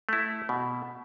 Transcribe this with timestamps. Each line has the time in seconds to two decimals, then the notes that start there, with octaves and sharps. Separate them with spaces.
0.09 A3 E4
0.49 B2